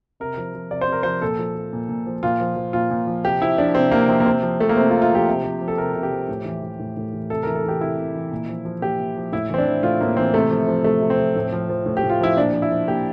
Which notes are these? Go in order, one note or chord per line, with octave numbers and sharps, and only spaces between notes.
C3 A#4
F3
F3
C3 D5
C5
C3 A#4
F3 C5
A#2 A4
F3
F3
A#2
A#2
F3
A#2 F4
F3
F3
A#2 F4
A#2
F3
C3 G4
F3 E4
F3 D4
C3 C4
C3 A#3
F3 C4
A#3
C3 C4
F3
F3 A3
A#3
C3 C4
F4
C3
F4
F3 G4
C3
F3
F3
A4
C3 A#4
C3
G4
F3
A2
E3
E3
A2
A2
E3
C3 A4
E3 A#4
A4
E3 G4
C3 E4
C3
E3
A#2
F3
F3
A#2 G4
A#2
F3
A2 E4
E3 C4
D4
E3
A2 F4
A2 A#3
E3 C4
C3 A3
F3
F3
C3 A3
C3
C4
F3
A2
F3
F3
A2
G4
A2
F4
F3 E4
A#2 D4
F3
E4
F3
A#2 G4